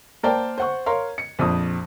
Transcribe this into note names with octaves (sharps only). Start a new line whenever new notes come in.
A#3 A#4 C5 D5 G5 A5
C5 F#5 C#6
A#4 C#5 F5 C6
C#7
A#1 F2 D#6